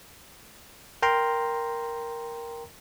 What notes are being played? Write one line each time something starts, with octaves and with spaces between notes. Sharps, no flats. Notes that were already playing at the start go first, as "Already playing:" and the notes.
A#4 G5 A#5 C6